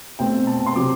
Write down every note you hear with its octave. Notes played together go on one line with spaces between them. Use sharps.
B2 A3 C4 G5
A5
A5
C6
C3 F#3 C4 D6